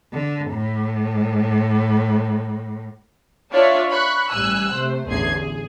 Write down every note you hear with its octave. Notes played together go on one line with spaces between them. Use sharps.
D3
A2
D4 F4 C#5 D5 E5 A5
B5 C#6 F#6
A1 G3 G#5 E6 F#6
C3 A3 C5
A1 E2 D3 G#4 G#6 C7
G#4